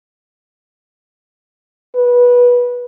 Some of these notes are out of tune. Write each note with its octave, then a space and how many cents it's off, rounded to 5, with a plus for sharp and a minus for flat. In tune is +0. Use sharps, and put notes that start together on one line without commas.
B4 -20